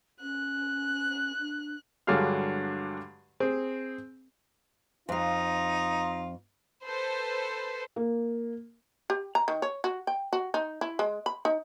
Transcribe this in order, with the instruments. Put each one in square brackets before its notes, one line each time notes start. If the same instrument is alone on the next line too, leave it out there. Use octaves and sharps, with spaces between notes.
[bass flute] C#4 [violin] F#6
[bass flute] D4
[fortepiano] G2 D3 F#3 G#3 F5 F6
C4 G#4
[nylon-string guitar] F2 F5 [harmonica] D#4 F4
[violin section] A4 B4 C5
[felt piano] A#3
[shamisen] G4
A#5
D#3
C#5
F#4
G5
F#4
D#4
E4
G#3
B5
D#4